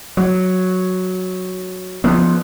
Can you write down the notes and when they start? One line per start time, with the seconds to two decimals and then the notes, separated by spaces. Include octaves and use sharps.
0.17 F#3
2.04 F3 B3